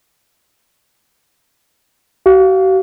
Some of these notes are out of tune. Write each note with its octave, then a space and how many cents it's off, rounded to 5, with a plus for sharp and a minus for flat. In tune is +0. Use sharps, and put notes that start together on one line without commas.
F#4 +45 F5 +0